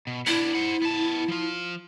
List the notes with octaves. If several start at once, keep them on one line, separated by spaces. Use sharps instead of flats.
B2
B3 D4 E4
C5 F#5
B3 A5
F3 F4